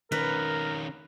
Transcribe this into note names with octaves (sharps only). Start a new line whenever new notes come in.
D#3 C#4 A#4 B4